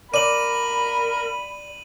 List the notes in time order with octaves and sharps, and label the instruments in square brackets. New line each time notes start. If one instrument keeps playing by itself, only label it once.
[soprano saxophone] A#4 [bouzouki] D5 [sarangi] B5 [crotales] D#7 F#7